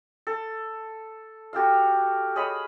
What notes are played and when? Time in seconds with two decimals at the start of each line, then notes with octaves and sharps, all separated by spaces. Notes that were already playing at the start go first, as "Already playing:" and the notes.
0.27 A4
1.53 F#4 G4 A4 F5
2.36 G#4 C#5 D#5 B5